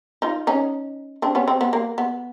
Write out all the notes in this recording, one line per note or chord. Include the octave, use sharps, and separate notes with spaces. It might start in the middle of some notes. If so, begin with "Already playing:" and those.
D#4 F4
C#4 D#4
C4 D4
B3 C#4
C4
B3
A#3
B3